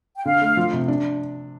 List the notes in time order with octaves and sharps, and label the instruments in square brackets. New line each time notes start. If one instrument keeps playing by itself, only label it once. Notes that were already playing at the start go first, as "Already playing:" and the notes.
[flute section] G5
[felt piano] D3 [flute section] F5
[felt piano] A3
F3
C3
D4